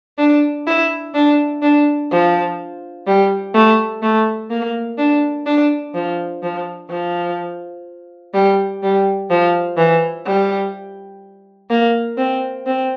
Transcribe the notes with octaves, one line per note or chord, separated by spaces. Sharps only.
D4
E4
D4
D4
F3
G3
A3
A3
A#3
D4
D4
F3
F3
F3
G3
G3
F3
E3
G3
A#3
C4
C4